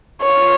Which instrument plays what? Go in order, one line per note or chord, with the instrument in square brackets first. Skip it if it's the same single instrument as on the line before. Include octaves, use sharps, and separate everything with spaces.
[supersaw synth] F4 [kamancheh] C#5